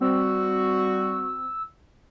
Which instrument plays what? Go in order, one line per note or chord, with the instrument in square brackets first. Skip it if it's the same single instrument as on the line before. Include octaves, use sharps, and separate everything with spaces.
[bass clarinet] G3 [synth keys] C4 [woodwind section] F#4 [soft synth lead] E6